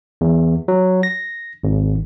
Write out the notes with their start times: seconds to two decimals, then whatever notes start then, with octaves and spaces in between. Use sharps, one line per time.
0.21 E2
0.68 F#3
1.03 A#6
1.64 G#1